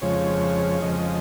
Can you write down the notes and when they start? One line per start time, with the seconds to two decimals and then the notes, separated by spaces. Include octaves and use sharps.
0.02 F2 C#3 F3 G#3 C#5
0.82 F2 C#3 F3 G#3 D#5